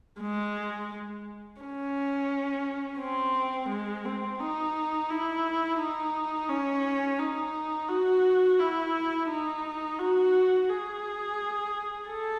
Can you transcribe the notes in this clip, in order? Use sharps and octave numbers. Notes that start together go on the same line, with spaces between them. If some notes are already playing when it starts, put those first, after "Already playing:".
G#3
C#4
C4
G#3
C4
D#4
E4
D#4
C#4
D#4
F#4
E4
D#4
F#4
G#4
A4